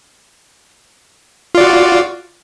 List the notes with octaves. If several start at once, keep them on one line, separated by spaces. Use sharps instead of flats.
F4 F#4 D5